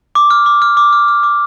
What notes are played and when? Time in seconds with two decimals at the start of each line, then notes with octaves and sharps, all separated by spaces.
0.15 D6
0.31 F6
0.46 D6
0.62 F6
0.77 D6
0.93 F6
1.08 F6
1.23 D6